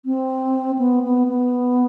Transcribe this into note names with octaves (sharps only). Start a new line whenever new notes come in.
C4
B3
B3
B3